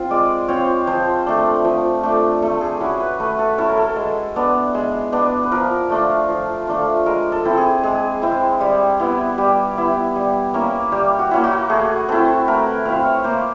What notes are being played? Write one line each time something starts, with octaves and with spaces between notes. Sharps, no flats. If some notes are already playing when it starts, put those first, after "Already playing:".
Already playing: C4 F4
G#3 D5
C4 F4 C#5
F3 C5
A3 D4
F3
A3 D4
A3 A4
G#4
C#4 E4 F#4
B4
A3 B4
A4
C#4 E4 A4
A#4
A4
G#3
B3 D4
G#3
B3 D4
B4
F3 A#4
A3 D4 F4
F3
A3 D4 F4
G#3 A#4
A4
C4 E4
G#4
G#3 G#4
C4 E4
G3
B3 E4
G3 G4
B3 E4
G3
A#3 C#4 E4
G3 G4
F#4
A#3 C#4 E4
F#4
A3 G#4
C4 E4 A4
A3 A#4
B4
C4 E4 F5
C#5
A#3 C5